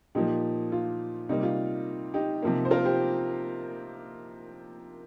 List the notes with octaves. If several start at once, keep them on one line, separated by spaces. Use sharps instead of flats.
A#2 F3 A#3 D#4 G4
F4
C3 G3 A#3 D#4
F4
D#4 G4
C3 F3 A#3
C5
F4 A#4
G4 C5